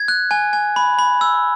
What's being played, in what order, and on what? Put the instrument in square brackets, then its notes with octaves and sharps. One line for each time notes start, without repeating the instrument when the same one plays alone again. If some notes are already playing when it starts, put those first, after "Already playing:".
Already playing: [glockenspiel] G#6
F#6
G#5
G#5
B5
B5
E6